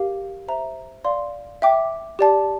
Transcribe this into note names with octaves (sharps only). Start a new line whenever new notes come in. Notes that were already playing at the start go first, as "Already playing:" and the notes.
Already playing: G4 A#4 F5
C5 E5 A#5
D5 F5 C6
E5 G5 D6
G4 D5 A5